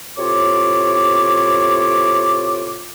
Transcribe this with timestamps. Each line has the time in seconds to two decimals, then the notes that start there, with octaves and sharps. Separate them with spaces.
0.17 A2 C3 F4 C#5 D6